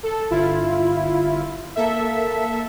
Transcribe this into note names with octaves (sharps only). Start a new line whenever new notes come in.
A4
G1 E4 F4
A#3 A4 E5